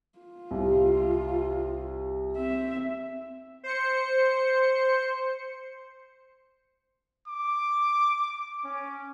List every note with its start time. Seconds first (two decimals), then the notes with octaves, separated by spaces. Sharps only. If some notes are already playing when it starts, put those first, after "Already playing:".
0.19 F4
0.51 C2 G3
2.36 C4 E5
3.63 C5 C#7
7.27 D6
8.64 C#4